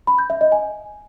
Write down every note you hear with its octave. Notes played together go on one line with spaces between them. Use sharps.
B5
G6
E5
D#5
G#5